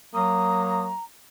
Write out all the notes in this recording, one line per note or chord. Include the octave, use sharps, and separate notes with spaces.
F#3 A#3 A#5 D#6